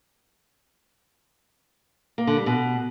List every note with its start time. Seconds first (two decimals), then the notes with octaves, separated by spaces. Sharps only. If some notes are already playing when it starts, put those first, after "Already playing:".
2.18 A#3
2.27 D3
2.37 G3
2.46 B2